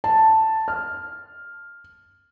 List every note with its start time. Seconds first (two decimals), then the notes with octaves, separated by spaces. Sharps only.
0.04 A5
0.68 F6